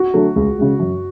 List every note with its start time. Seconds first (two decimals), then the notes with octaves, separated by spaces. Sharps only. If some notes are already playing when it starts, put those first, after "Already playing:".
Already playing: F#4
0.14 D3 F#3 A3
0.36 C#2
0.58 C#3 G#3
0.79 F#2